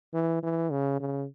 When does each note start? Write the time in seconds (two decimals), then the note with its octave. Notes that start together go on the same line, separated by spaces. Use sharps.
0.14 E3
0.43 E3
0.72 C#3
1.00 C#3